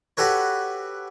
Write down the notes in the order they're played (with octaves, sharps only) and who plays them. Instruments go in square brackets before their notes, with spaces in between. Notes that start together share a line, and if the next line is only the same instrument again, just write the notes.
[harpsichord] F#4 G4 A4 B4 C#5